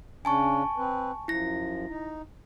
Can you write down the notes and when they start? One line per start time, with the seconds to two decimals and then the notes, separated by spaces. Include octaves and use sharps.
0.25 C#3 C#4 D4 G#5 A5 C#6
0.78 C4 B4
1.28 F#2 F3 E4 A#6
1.89 D#4